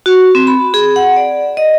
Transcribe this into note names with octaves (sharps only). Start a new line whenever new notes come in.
F#4
C4
B5
G#4
F#5
D5
D#5